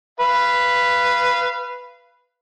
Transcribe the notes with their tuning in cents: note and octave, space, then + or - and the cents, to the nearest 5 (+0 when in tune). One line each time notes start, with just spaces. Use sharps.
B4 +0 F5 -25